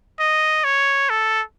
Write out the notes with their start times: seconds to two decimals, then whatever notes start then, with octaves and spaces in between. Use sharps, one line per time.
0.20 D#5
0.64 C#5
1.10 A4